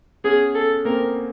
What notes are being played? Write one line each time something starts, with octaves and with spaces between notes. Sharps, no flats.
B3 C#4 G#4
A4
A#3 C4 A#4